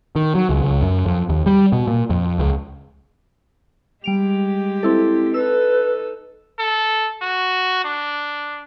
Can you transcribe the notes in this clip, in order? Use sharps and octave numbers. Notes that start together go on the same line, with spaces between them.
D#3
F#3
C#2
C#2
F#2
F2
D#2
G3
B2
A#2
F2
C#2
G3 G#3 G4 D7 F7
C4 E4 A4
D#4 A4 B4 E6
A4
F#4
D4